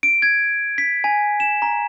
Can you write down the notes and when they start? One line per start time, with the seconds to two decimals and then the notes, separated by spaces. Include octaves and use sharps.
0.03 D7
0.22 G#6
0.78 B6
1.04 G#5
1.40 E7
1.62 A#5